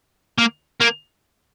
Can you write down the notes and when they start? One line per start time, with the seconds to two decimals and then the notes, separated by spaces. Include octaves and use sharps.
0.38 A#3
0.81 A#3